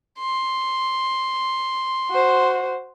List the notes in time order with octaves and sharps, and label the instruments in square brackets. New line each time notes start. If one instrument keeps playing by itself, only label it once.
[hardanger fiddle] C6
[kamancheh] F#4 C5